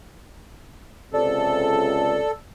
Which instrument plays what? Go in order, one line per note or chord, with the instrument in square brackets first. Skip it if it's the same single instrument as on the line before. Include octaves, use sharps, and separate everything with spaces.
[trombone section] C#2 C3 [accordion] A4 [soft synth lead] D5